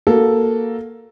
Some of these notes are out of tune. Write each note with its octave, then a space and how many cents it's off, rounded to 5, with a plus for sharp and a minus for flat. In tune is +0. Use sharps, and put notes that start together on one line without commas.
A#3 +0 F#4 +0 A4 +0